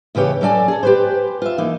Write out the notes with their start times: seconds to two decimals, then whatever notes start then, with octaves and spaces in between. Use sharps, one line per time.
0.15 D#2 C#3 E3 G4 C#5
0.41 F#3 C#4 A4 D5 G#5
0.68 G#4 A4
0.83 G4 B4 C5
1.42 F4 E5
1.58 E3 A#3 D#4